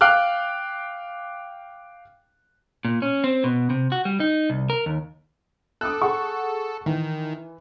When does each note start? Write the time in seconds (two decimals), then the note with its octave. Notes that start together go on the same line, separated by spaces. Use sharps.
0.01 F5 G5 D6 F6 F#6
2.85 A#2
3.02 C#4
3.24 C4
3.44 B2
3.70 C3
3.92 F#4
4.05 G3
4.20 D#4
4.50 C2
4.70 A#4
4.86 D#2
5.81 A4 D6 D#6 F#6
6.02 G#4 F#5 C#6
6.86 D#3 E3